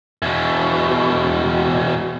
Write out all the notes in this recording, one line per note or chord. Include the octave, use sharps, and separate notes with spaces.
E2 B2